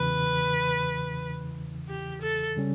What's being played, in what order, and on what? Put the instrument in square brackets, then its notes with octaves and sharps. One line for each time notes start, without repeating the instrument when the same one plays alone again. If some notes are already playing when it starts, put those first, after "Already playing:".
Already playing: [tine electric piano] E2 C#3 E3 [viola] B4
[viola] G4
A4
[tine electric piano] C#3 G3 C#4